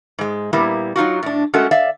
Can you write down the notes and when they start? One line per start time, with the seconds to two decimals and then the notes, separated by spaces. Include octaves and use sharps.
0.19 G#2 G#3
0.53 A#2 G3 A#3 B3 E4
0.96 F#3 D#4 F4 F#4
1.23 A2 D4
1.54 G#3 A3 C#4 F#4 A4 A#4
1.71 D5 E5 F5